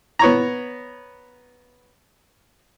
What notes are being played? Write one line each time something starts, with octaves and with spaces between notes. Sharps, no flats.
B3 C#5 A#5